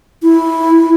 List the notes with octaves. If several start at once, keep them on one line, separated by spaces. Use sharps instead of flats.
E4